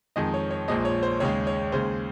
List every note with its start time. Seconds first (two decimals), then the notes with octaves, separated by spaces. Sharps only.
0.16 F2 D#3 G#3 D#5
0.34 C#5
0.51 C#5
0.68 A#1 A#2 F3 G#3 D#5
0.85 C#5
1.03 C5
1.20 D#2 C#3 G#3 C#5
1.47 C#5
1.72 D#2 C#3 G#3 C5